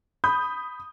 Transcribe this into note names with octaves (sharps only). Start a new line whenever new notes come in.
B5 D#6 G6